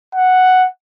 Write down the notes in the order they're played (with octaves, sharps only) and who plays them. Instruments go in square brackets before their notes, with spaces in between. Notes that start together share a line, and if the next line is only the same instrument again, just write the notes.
[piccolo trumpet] F#5